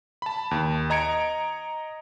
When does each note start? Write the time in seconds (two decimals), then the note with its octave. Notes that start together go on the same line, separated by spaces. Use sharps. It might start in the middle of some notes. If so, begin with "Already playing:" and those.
0.22 A5 B5
0.51 D#2
0.90 D#5 A#5 G#6 C#7 D7